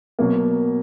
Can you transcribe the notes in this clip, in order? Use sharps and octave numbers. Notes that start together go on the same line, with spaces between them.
B2 F#3 A#3